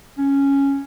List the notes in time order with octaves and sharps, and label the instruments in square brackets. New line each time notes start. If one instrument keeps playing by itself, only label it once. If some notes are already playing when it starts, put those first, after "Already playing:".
[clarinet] C#4